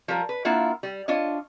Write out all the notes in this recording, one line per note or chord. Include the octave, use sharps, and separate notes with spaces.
F3 G3 A#4
B4
A#3 D4 E4 F4 F#5
G3
D4 F4 C#5 D#5